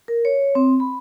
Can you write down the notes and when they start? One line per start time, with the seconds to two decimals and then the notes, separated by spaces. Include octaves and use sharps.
0.08 A#4
0.25 C#5
0.55 C4
0.80 B5